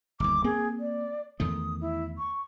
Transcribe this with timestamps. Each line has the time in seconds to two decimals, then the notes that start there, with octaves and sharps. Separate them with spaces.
0.20 G1 D#2 D6
0.44 A#3 C4 G#4
0.80 D5
1.40 E2 D#3 A3 D#6
1.81 E4
2.18 C#6